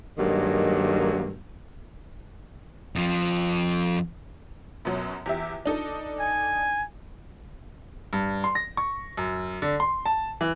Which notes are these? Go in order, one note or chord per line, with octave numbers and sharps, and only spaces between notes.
G2 D#3 F#3 G#3 A#3
F2 F3
F#2 B2 F#3
E2 G4 E5
D4 D#4 A4
G#5
G2
C6
A#6
C#6
F#2
D3
C6
A5
E3